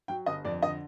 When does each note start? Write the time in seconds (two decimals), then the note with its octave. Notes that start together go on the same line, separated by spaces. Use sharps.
0.08 F#3 G5
0.26 G1 D#5
0.45 F2 D5
0.62 D3 D#5